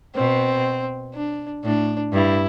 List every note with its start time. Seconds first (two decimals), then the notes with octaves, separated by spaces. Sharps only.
0.15 B2 C4
1.14 D4
1.64 A2 D4
2.13 G2 E4